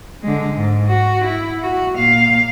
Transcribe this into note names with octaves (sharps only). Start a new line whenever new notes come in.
D3 G#3
G#2
F#4
E4
F#4
A#2 F5